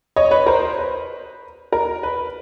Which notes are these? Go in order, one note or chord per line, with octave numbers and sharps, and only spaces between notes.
C#5 D#5
B4 C#5
A#4 C5
B4
A#4
B4